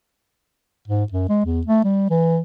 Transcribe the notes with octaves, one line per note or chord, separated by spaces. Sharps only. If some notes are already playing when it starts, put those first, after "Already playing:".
G#2
F#2
G#3
E2
A3
G3
E3